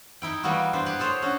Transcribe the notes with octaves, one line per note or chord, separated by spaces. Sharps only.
D#4 E4 G5
E3 G3 A#3 B3 E4 F#4
B3 D4 C5
G4 F#5 G#5
G#4 A4 C5 C#5
C#4 D4 F#4